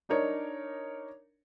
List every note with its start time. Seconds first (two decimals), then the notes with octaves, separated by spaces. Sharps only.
0.09 D4 D#4 A#4 C#5 D5